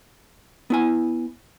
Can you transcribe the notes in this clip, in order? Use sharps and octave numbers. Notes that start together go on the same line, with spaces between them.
B3 E4 G#5